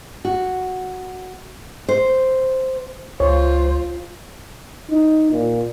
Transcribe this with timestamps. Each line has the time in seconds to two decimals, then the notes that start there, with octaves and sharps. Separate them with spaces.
0.25 F#4
1.89 C5
3.20 C#2 F4 C5 C#5
4.90 D#4
5.31 A#2